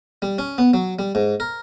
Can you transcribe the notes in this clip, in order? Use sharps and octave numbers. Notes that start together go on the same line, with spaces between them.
G3
C#4
B3
F#3
G3
G#2
A#4